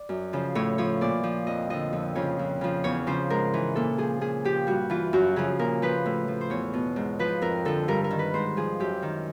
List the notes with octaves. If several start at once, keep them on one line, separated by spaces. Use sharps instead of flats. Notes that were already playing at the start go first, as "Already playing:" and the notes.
Already playing: D5
F#2
C#3 F3
A2 C#5
F3 C#5
A#2 D5
F3
F2 D#5
D3 F3 D#5
F2
C#3 F3 C#5
F2
C#3 F3
E2 C#5
C#3 F3 C5
G#2 A#4
E3
A#2 A4
F3 G#4
A#2 G#4
F3 G4
G2 F#4
E3 F4
F#2 F#4
C#3 F3 G#4
A#2 A#4
F3 B4
A2
F3
C5
E2 C#5
B2
G#2
F3 B4
F2 A#4
D3 F3 A4
G2 A#4
A#4
D#3
B4
G#2 C5
F3 G#4
F#2 G4
D#3